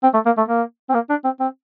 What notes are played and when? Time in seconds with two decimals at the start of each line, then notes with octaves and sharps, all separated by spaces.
0.03 C4
0.14 A3
0.26 A#3
0.37 A3
0.48 A#3
0.89 C4
0.94 A#3
1.10 D4
1.24 C4
1.40 C4